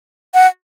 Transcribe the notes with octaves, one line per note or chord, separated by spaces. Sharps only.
F#5